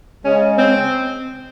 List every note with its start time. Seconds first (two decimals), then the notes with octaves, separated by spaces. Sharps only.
0.23 C#3 G#3 C#4
0.57 C4